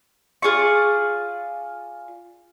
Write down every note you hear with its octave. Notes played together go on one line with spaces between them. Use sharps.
F4 G#4 D5 C#6